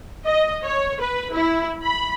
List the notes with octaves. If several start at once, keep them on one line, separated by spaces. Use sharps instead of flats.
D#5
C#5
B4
E4
B5